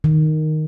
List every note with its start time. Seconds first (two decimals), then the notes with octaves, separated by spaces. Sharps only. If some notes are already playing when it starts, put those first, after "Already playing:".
0.04 D#3